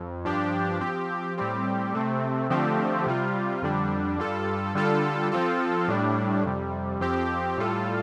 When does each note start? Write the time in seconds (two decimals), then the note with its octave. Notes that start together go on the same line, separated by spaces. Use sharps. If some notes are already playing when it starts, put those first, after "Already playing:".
Already playing: F2
0.25 G2 F3 D4 G4
0.81 F3 C4 G4
1.38 A2 G3 C4 G4
1.94 C3 A3 C4
2.50 D3 F3 A3 C4 G4
3.07 C3 G3 F4
3.62 F2 D3 G3 D4
4.19 G2 G3 F4 A4
4.75 D3 G3 F4 A4
5.32 F3 C4 F4 A4
5.88 A2 G3 D4
6.45 F2 C3 G3
7.00 F2 F3 C4 G4
7.57 A2 G3 F4 A4